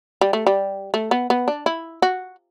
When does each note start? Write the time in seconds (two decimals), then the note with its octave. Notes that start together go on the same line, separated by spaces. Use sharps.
0.21 G3
0.33 A3
0.47 G3
0.94 A3
1.11 B3
1.30 B3
1.48 D4
1.66 E4
2.02 F#4